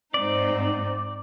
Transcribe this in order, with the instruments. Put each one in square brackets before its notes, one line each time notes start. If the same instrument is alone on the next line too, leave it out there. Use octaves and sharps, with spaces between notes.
[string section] G#2 C4 D#4 [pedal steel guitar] D5